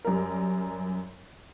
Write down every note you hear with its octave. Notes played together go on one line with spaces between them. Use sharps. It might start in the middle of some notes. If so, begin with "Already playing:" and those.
F#2 G3 A#4